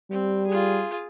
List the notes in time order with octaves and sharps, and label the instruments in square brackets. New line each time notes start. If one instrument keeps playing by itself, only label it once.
[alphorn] G3 [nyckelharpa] C4
[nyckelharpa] F4 G#4